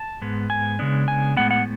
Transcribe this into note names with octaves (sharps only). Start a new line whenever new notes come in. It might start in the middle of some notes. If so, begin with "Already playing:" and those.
Already playing: A5
G#2 G#3 B3
G#5
C#3 G#3 B3 D4
G#5
A2 G#3 B3 F#5
F#5